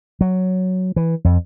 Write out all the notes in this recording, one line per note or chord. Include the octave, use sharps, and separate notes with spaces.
F#3
E3
F2